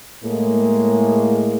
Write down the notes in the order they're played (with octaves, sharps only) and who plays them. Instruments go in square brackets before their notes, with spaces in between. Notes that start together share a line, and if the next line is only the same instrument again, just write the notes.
[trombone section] A2 G#3 A#3